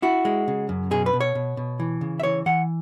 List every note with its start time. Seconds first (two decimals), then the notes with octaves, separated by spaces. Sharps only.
0.02 E4 F#4
0.25 G#3
0.48 C#3
0.69 F#2
0.91 B2 G#4
1.06 B4
1.13 B2
1.20 C#5
1.35 B2
1.57 B2
1.80 E3
2.01 C#3
2.20 E5
2.23 E3 C#5
2.46 E3 F#5